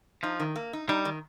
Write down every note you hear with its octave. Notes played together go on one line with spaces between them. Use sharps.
F3 D#4
D#3
A#3
D#4
G3 D#4
D#3